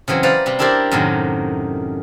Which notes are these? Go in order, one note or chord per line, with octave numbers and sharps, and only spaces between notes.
C#3 E3 F#3 C4
B4 C5 D5 F5 A#5 B5
C3 G3
D4 E4 G4 A#4 C5 D5
F#2 A2 C3 D#3 F#3 D#4